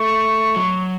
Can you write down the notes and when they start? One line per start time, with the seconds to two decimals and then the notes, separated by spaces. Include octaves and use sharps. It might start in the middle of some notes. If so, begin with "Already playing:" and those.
Already playing: A3 C#6
0.56 F#3